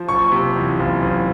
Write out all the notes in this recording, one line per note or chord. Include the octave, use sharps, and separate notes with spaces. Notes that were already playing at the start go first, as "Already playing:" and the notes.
Already playing: F3
F#1 C#6
C3
E2
F#1
F#1